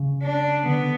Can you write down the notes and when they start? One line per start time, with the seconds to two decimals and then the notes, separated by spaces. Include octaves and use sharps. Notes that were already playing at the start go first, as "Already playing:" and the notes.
Already playing: C#3
0.22 D4
0.66 D3 B3